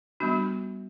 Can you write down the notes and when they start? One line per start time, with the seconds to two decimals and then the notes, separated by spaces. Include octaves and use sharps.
0.20 G3 B3 D4 F#4